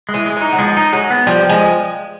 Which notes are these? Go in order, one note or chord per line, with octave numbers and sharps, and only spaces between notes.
G#3
E3
G#3
E3
D#4
F#3
F3 G#3
D#4
F#3 G#3
B3
F3 G3
F3
G#3